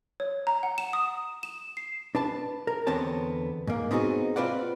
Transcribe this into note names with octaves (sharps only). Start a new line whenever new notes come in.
C#5
A#5
F#5
E7
D#6
E7
C7
D4 B4 A5
A#4
E2 D3 B3 C4 C#5 A5
G#2 A#3
B3 C4 D#4 F#4 G#4
C4 F4 B4 D5 F#5